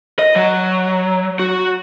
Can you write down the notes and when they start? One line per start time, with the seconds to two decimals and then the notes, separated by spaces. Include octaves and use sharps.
0.19 D#5
0.36 F#3
1.39 F#4